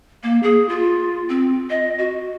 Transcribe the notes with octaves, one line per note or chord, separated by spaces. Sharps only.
A#3
G#4
F4
C4
D#5
F#4